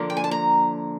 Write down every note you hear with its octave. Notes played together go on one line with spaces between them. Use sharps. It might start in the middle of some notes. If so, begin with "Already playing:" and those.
Already playing: D3 F3 A#3
G5
G#5
A5
A#5